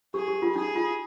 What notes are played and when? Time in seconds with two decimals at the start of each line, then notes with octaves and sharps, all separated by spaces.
0.14 G4 G#4
0.28 G4
0.42 F4
0.55 D#4 G#4
0.76 F4